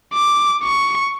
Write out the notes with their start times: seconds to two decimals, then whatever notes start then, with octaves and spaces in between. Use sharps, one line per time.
0.14 D6
0.64 C#6